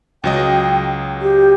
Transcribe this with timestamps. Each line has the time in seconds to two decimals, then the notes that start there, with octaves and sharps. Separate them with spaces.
0.24 C#2 F#3 D#5 G5
1.22 G4